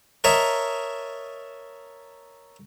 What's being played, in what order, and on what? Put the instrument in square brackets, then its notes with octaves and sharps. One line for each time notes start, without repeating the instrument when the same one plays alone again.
[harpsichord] A#4 C#5 D#5 E5 A5 A#5